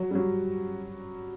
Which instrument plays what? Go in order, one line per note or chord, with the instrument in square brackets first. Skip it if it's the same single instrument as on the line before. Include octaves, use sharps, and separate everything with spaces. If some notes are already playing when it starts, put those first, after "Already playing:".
Already playing: [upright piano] F#3
G3
F#3